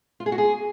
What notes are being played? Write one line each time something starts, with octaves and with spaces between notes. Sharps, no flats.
F4
G#4
F#4
G#4